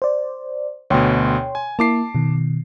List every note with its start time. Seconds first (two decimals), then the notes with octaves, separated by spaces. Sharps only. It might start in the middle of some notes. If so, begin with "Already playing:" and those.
0.02 C5 D5
0.90 D2 B2 C#5 G5 C6
1.55 G#5
1.79 A#3 E4 A5 D6 C7
2.15 B2 D#3